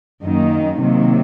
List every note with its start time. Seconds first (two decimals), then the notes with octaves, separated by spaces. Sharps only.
0.23 F#2 D#3 A#3 D#4
0.79 C3 D#3 F#3 A#3